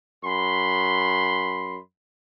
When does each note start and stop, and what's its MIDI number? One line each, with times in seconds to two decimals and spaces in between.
0.24 1.77 42
0.24 1.77 83
0.24 1.77 84